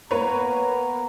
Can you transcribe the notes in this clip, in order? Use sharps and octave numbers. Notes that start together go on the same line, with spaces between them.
A#3 B3 B4 C#5 A#5